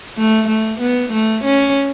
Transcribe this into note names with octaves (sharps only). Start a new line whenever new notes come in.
A3
A3
B3
A3
C#4